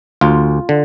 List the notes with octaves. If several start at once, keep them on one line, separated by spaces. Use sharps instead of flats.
D2 F4
D3